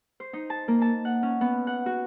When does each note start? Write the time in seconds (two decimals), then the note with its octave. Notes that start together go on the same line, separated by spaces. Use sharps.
0.20 C5
0.33 D#4
0.50 A5
0.68 A#3
0.82 A5
1.05 F#5
1.23 C#4
1.41 B3
1.67 F#5
1.86 F#4